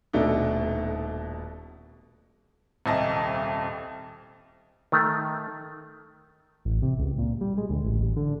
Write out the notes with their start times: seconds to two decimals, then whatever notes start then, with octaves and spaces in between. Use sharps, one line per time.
0.13 D#1 B2 A3 D4 D#4
2.86 D#1 C2 D#5 A5
4.92 D#3 A3
6.65 A1
6.82 C3
6.99 C#2
7.18 A#2
7.41 G3
7.57 G#3
7.70 D2
7.84 A1
8.16 D3